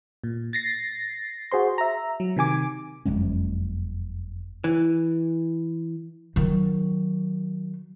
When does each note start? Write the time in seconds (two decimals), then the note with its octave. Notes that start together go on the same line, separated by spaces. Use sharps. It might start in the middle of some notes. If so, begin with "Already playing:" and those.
0.24 A#2
0.53 A6 A#6 C7
1.51 F#4 G#4 C5 C6
1.78 E5 A#5
2.20 F#3
2.37 C3 D#3 G#5 D6
3.05 F#1 F2 G#3 C#4
4.64 E3
6.36 D#3 F#3